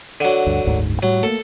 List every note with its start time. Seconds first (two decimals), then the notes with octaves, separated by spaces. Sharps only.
0.20 D3 F#3
0.47 D2 G2
0.64 F#1 D2 G#2
1.03 A2 F#3 G3
1.23 A3 A#3 A4